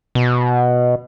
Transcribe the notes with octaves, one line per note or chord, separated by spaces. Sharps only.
B2